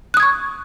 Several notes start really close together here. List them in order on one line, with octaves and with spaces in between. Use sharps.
F#6 D#6 G#6 C#6